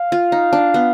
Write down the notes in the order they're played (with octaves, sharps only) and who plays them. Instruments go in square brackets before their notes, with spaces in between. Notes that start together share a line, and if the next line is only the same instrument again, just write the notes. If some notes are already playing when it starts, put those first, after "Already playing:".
Already playing: [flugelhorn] F5
[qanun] F4
D#4
D4
B3